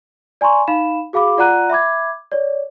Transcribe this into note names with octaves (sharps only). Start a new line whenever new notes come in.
D5 G#5 A#5 C6 C#6
D#4 F5 B5 E7
F#4 G#4 F5 B5 D6
F4 D5 F#5 A#5 F#6 D#7
E5 B5 D6 G#6
C#5 D5